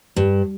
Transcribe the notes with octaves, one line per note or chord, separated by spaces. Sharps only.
G2